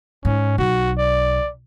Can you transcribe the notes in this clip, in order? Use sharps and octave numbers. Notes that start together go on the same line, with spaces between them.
G#2 C#4
B1 F#4
D5